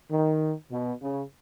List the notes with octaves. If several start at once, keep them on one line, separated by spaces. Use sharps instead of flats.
D#3
B2
C#3